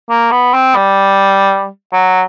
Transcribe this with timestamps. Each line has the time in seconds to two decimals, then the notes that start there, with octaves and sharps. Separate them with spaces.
0.10 A#3
0.31 B3
0.54 C4
0.75 G3
1.92 F#3